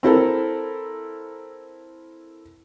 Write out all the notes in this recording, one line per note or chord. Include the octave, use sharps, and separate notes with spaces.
C4 E4 A4 A#4